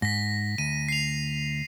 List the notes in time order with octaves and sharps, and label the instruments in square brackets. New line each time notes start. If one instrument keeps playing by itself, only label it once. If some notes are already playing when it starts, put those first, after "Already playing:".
[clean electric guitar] G#2 [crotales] A#6 B6
[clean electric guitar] D2 [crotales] D#7
[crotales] C7 F7